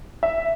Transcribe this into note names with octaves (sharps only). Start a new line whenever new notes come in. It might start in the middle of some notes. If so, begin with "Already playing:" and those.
E5